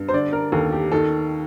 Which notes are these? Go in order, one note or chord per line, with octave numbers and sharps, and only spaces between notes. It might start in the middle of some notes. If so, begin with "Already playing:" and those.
Already playing: G2
C5
D3 D5
A#4
D#2 A4
G4
D#3 A4